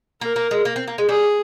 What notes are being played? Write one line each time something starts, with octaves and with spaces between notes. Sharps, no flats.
A#3 A#4
A#3
G#3
A#3
C4
A#3
G#3
G3 G#4